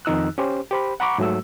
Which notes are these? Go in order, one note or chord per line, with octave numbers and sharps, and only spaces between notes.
F2 D#3 D#4 E6 F#6
C#4 G4 C5
G4 C5 B5
F#5 A#5 B5 C#6 D6
G#2 F#3 A3 E6